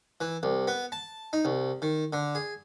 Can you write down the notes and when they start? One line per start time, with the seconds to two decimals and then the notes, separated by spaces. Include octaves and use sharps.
0.21 E3
0.43 C2
0.67 B3
0.92 A5
1.33 D#4
1.45 C2
1.82 D#3
2.13 D3
2.35 G#4